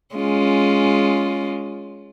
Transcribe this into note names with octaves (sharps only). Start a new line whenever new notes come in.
G#3 C#4 F4